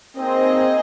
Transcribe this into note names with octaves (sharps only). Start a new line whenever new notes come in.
A#3 C4 D#4 G#4 C5 D#5